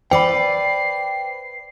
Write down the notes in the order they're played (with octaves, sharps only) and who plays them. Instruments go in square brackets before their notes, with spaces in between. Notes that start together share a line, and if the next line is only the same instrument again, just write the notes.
[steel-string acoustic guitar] B4 D5 [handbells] C5 D6 [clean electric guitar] G5 B5 [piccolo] C7